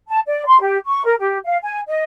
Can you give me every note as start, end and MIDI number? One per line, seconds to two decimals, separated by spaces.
0.08 0.19 81
0.26 0.45 74
0.46 0.60 84
0.61 0.77 67
0.87 1.03 85
1.04 1.15 70
1.19 1.38 67
1.44 1.56 77
1.62 1.80 80
1.87 2.03 75